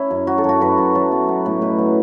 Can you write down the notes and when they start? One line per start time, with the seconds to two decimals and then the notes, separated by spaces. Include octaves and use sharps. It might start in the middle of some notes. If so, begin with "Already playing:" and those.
Already playing: C#4 E4
0.11 F#2
0.27 F#3 F#4
0.38 A4
0.44 F#2 F#4
0.61 F#2 B4
0.78 F#2
0.95 F#3 A4
1.12 B3
1.29 B3
1.46 A2
1.62 B2 B4
1.79 F#3